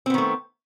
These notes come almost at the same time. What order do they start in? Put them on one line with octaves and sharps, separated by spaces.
C4 B3 D#3 A3